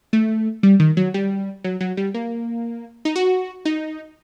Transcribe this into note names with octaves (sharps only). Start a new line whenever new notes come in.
A3
G3
D#3
F#3
G3
F#3
F#3
G3
A#3
D#4
F#4
D#4